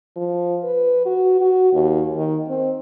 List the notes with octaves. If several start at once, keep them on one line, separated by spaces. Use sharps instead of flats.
F3
B4
F#4
F#4
D#2
D#3
C4